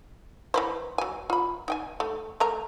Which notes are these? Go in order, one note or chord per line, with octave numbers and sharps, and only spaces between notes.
E3 B4 C5
F#3 G#5
F4 B5
D#4 G5 G#5
A3
A3 A#4 A#5